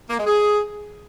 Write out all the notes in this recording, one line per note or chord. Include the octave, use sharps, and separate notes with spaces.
A#3
G#3
G#4